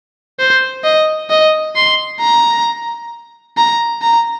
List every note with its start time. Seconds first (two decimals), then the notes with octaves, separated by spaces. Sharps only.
0.39 C5
0.84 D#5
1.30 D#5
1.75 C6
2.20 A#5
3.57 A#5
4.02 A#5